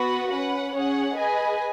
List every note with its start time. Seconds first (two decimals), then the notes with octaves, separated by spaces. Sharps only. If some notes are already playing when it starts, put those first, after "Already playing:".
Already playing: B3 F#4 B4 F#5
0.30 C#4 B4 F#5
0.74 C#4 G#4 C#5 F#5
1.17 G#4 B4 D#5 G#5